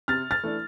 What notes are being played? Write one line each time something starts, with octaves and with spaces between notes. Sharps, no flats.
C3 F6 A6
F6 A6
E3 A3 D4